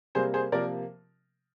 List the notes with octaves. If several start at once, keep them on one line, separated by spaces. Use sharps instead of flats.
C3 G3 A#3 G#4 C5
G#4 C5
C3 F3 A#3 A#4 D5